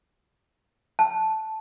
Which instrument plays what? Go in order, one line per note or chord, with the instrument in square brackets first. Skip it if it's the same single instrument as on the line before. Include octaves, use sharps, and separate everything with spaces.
[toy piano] A5